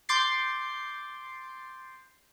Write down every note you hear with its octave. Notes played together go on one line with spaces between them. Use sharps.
C6 D6 G6 A6 C7